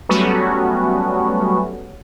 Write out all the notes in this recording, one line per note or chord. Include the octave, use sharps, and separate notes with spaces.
F#3 G3 A3 B3 C#4 F#4